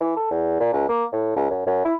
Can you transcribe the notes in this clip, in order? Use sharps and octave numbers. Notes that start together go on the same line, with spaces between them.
E3
A4
E2
A#2
C#2
A#3
A2
C#2
F#2
F#2
E4